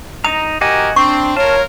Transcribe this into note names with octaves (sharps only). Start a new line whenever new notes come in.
D#4 A#5 D#6
D#4 F#4 G4 A#4 D#5 G#5
C4 D4 C#6
F4 A#4 C#5 A5